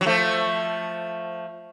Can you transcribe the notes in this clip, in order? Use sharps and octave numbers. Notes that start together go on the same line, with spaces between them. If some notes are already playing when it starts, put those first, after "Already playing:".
F#3
F3 A3